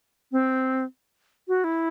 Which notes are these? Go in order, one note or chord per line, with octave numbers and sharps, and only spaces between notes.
C4
F#4
E4